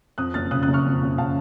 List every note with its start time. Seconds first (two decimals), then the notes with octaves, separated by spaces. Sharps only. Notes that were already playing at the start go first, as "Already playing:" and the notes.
0.18 F2 D#6 F#6
0.34 F#1 F6 A6
0.51 C#3 D#6 F#6
0.62 D#6 F#6
0.68 F#1
0.73 C#6 F6
0.85 F2
1.02 F#1
1.18 C#3 F5 A5